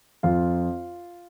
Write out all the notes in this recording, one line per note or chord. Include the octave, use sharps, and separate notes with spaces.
F2 F4 F5